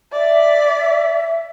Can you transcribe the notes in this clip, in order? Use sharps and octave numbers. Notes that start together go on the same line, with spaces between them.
D5 E5